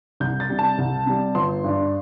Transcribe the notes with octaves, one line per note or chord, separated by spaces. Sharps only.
C2 G6
A6
C3 G3
A5
C2
C3 G3
G1 C6
G2 G3 D4